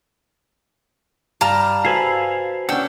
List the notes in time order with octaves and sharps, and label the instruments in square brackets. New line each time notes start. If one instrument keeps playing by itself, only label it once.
[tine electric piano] G2 F5 [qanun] G3 [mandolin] A5 A#5 F6
[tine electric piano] F#4 B4 C5 [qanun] A4 [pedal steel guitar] F5 G#5 B5
[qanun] C#4 D4 [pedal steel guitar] F#5 G5 [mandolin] E6